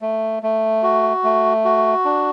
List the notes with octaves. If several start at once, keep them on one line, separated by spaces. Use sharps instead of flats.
A3
A3
F#4
A3
F#4
D4